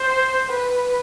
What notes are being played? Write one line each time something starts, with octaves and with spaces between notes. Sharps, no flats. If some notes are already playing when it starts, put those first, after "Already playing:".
Already playing: C5
B4